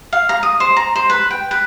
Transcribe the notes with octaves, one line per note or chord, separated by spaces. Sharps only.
F5
A#5
D#6
C5
A#5
C5
B4
G5
B4